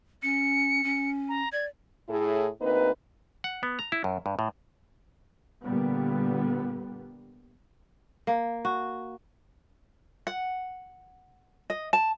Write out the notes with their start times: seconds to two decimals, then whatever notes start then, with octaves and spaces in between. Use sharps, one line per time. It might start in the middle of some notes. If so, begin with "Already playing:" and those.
0.23 C#4 C#7
0.84 C#4
1.29 A#5
1.52 D5 G#6
2.09 A2 E4 G#4
2.61 D2 A#3 C4 D#4 B4
3.44 F#5
3.63 B3
3.79 A#5
3.92 E4
4.04 F#2
4.26 G2
4.39 A2
5.65 A#2 D3 G3 B3
8.27 A#3
8.65 F#4
10.27 F#5
11.70 D#5
11.93 A5